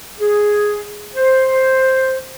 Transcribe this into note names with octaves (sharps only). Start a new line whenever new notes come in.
G#4
C5